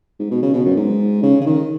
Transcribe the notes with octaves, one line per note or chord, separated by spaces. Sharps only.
G#2
B2
C#3
B2
F#2
G#2
C#3
C#3
D#3